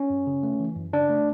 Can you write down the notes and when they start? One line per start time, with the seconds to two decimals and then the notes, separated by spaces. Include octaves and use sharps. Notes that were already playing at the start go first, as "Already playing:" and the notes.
Already playing: C#4
0.10 F#2
0.27 C#3
0.43 A3
0.60 E3
0.76 F#2
0.93 C#3 D4
1.10 A3